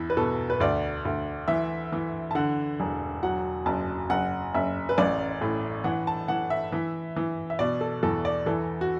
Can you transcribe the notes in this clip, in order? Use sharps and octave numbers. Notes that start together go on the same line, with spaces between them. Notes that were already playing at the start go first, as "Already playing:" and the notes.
Already playing: E2 E4
B4
B2 A4
B4
D2 D5
D2
E3 E5
E3
A5
D3 F#5
E1
F#3 F#5
F#1 A5
F#1 F#5
F#1 E5
B4
A1 D5
A2
E3 F#5
A5
E3 F#5
E5
E3
E3
E5
B2 D5
A4
E2 A4
D5
E3 A4
F#4